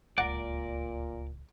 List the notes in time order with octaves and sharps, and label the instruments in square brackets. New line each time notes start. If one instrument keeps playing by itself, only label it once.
[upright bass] D1 C#2 [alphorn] A#2 [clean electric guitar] A#4 D5 [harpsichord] F#5